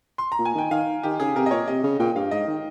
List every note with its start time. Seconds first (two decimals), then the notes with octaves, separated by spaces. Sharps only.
0.18 C6
0.32 A#5
0.39 A#2
0.45 G#5
0.55 D#3 G5
0.71 D#3 F5
1.03 D#3 G4
1.20 C#3 G#4
1.36 C3 A#4
1.46 D#5
1.51 A#2 C#5
1.67 C3 D#5
1.83 C#3
1.99 A#2 G5
2.16 G2 F5
2.31 G#2 D#5
2.47 D#3